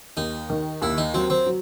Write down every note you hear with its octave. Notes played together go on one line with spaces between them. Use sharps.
D#2 D#4
D#3
D#2 E4
D#4
F#3 C4
C4
F#3